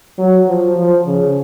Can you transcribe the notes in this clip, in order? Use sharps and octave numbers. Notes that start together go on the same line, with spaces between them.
F#3
F3
F3
C#3